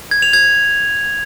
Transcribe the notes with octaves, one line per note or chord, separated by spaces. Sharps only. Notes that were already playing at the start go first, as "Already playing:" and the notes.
G#6
F7
G#6